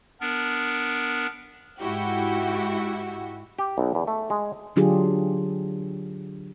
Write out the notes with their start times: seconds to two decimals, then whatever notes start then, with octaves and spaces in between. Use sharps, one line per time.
0.21 B3 D4 A#4
1.80 G#2 E4 F#4 G4
3.59 G4
3.78 B1
3.95 E2
4.08 A3
4.30 G#3
4.76 D3 F#3 D4 F4 G4 G#4